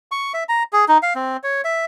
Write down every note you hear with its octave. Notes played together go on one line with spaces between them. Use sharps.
C#6
E5
A#5
G#4
D#4
F5
C4
C#5
E5